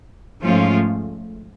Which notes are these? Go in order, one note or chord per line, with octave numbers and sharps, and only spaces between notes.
G#2 F3 A3 C#4 F4